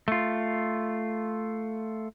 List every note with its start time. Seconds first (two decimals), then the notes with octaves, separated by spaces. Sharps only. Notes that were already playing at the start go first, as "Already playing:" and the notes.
0.08 A3 F4